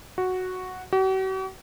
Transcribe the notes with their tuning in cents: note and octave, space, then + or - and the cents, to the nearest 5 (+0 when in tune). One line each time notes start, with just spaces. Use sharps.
F#4 -5
F#4 +45